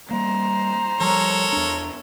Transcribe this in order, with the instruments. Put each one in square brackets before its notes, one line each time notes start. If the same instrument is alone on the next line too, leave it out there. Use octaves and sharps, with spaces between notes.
[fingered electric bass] G3 A#3 [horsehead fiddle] C5 A#5
[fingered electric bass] F3 G3 [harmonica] A4 A#4 C#5
[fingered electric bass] E2 D4